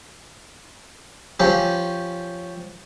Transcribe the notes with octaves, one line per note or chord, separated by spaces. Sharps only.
F3 C#4 G4